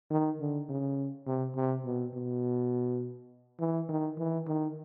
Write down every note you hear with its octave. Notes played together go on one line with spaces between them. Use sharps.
D#3
D3
C#3
C3
C3
B2
B2
E3
D#3
E3
D#3